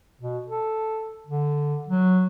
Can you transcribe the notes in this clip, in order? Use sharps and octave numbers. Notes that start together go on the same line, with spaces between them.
B2
A4
D3
F#3